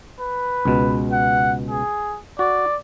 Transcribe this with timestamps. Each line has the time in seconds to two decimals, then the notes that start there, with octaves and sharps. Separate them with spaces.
0.20 B4
0.65 C#2 B2
1.12 F#5
1.70 G#4
2.39 F#4 D5